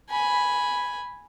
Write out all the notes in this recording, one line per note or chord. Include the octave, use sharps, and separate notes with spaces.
G#5 B5